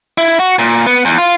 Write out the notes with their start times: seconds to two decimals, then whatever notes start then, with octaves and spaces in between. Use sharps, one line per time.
0.18 E4
0.39 F#4
0.59 A#2
0.86 B3
1.05 E2
1.18 F4